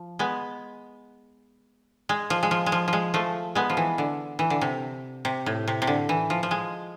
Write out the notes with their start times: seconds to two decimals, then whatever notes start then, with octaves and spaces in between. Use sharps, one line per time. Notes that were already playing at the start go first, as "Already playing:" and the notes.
Already playing: F3
0.19 G#3 B3
2.09 G#3
2.30 F3
2.43 G#3
2.51 F3
2.66 G#3
2.72 F3
2.88 F3
2.93 G#3
3.14 F3 A3
3.55 G#3 B3
3.70 F3
3.77 E3
3.98 D3
4.39 E3
4.50 D3
4.61 C3
5.25 C3
5.46 A2
5.68 C3
5.82 C3
5.87 D3
6.09 E3
6.30 F3
6.43 F3
6.51 G#3